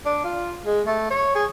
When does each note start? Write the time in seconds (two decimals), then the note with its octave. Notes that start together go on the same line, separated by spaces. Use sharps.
0.06 D4
0.24 F4
0.65 G#3
0.86 A3
1.11 C#5
1.35 G#4